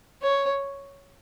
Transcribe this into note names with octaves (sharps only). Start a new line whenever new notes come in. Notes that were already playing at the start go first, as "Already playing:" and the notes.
C#5